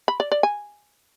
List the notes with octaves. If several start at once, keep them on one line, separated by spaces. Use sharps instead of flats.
B5
D5
D5
G#5